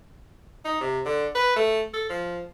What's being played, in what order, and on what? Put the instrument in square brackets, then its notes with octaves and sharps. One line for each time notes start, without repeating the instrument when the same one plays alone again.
[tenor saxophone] D#4
C3
D3
B4
A3
A4
F3